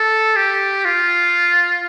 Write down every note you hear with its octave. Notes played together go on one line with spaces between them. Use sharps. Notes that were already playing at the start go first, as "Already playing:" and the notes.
Already playing: A4
G4
F4